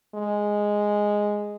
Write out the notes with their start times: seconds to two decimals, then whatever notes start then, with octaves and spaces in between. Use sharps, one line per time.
0.15 G#3